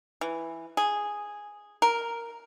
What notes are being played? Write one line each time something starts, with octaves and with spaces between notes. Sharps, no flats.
E3
G#4
A#4